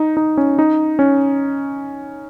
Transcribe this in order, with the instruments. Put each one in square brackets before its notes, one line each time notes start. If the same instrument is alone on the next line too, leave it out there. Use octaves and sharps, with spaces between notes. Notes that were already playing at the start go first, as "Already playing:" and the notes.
Already playing: [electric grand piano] D#4
D#4
C#4
D#4
C#4